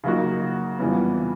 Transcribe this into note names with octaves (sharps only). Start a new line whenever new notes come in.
C#3 F#3 A#3 D#4 F#4
F2 C#3 E3 G3 B3